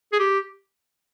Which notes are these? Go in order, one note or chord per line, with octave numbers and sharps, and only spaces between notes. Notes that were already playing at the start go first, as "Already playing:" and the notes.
G#4
G4